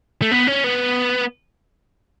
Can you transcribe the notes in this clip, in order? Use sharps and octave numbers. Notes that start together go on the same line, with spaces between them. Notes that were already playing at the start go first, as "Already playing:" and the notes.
A3
B3
C#4
B3